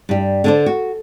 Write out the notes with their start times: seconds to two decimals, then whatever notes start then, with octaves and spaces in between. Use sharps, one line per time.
0.09 G2 G3
0.44 D3 D4 C5
0.66 F#4